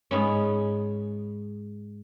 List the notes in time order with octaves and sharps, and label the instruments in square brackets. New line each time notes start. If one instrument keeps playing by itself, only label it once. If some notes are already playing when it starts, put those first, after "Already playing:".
[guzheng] G#2 B3 C#4